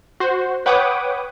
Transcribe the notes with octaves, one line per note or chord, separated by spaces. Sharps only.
F#4 C5
B4 C#5 F#5 G5 D6 D#6